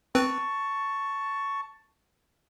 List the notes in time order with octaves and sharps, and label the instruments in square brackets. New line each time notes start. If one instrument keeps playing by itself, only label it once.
[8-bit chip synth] C4 B4 [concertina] A5 C#6